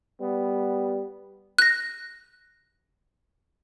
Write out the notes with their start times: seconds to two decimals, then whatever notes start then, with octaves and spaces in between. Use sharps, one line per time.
0.21 G3 B3
1.59 F#6 A#6